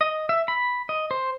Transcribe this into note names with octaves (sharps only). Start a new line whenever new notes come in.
D#5
E5
B5
D#5
C5